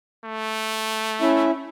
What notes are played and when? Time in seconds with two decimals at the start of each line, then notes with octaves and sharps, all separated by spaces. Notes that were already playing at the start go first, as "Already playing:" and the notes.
0.25 A3
1.21 C#4 E4 E5